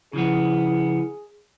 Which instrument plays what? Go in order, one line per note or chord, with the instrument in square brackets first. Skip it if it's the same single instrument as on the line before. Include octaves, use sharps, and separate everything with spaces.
[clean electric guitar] C#3 F3 B3 [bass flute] E4 [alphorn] G#4